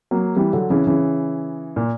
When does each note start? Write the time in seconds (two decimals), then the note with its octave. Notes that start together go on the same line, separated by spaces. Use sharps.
0.11 F#3 A#3
0.36 E3 G3
0.53 D3 F#3
0.70 C#3 E3
0.87 C#3 E3
1.76 A#2